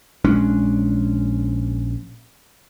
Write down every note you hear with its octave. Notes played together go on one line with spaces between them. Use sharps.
A#1 G#3 C#4 D4